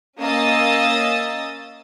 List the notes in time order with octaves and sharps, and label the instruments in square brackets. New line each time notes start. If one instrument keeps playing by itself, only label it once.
[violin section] A#3 C#4 D#5 D#6 E6 A6